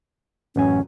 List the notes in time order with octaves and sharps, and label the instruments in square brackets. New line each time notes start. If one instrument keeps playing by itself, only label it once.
[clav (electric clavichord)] A1 F#2 G#5 [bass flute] C#4